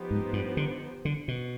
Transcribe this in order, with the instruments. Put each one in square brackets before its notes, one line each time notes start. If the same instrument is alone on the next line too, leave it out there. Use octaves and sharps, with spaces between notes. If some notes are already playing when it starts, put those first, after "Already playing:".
Already playing: [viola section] F3 B3 D#4 G4 C5
[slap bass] G#2
G2
D3
D3
B2